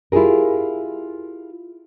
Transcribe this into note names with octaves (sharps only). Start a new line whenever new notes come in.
E4 F4 G4 G#4 A#4